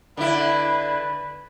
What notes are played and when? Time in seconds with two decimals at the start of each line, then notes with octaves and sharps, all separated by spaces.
0.17 D3 E4 B4